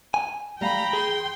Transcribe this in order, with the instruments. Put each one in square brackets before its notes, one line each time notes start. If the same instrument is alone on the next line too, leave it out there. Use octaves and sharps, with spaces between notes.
[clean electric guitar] G#5
[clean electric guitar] G3 A3 F5 [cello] G5 [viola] A#5 B5
[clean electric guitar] G#4 [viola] C6